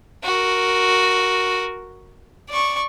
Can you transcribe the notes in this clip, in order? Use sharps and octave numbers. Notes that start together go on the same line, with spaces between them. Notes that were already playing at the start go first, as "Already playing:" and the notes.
F#4 A#4
D5 C#6